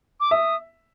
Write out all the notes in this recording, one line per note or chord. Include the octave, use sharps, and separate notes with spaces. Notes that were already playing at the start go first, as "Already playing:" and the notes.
D6
E5 D#6